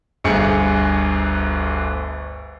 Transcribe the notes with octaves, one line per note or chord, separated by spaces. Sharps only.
G1 D2 G#4 C#7